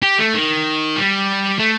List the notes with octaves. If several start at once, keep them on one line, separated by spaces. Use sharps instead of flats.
G4
A3
D#3
G3
A3